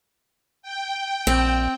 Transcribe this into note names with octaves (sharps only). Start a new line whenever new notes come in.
G5
A#1 C4